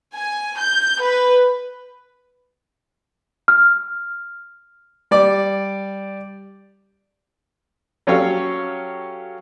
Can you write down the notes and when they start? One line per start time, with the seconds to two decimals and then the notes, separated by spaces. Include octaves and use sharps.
0.14 G#5
0.58 G6
1.02 B4
3.48 F6
5.11 G3 D5 D6
8.07 F#3 C#4 G4 A4 C#5 F5